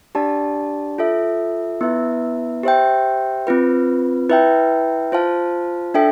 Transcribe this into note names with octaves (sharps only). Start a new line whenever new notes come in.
D4 G4 D5 A5
F4 A4 E5
B3 E4 B4 E5
G4 C5 E5 G5
C4 F4 B4
E4 B4 E5 G5
F4 C5 F5 A5
D4 A4 E5 G5